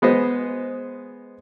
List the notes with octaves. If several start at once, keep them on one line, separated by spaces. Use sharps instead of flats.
G#3 B3 C5 D#5